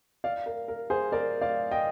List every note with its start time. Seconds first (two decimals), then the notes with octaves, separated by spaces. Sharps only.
0.24 D5 F5
0.46 A#4
0.68 A#4
0.90 G#4 C5
1.12 A#4 D5
1.41 D5 F5
1.71 D#5 G5